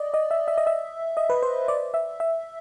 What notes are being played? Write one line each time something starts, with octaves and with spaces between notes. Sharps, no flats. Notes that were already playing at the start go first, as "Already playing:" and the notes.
Already playing: D5 D#5
D#5
E5
E5
D#5
E5
D#5
B4
C5
D5
E5
E5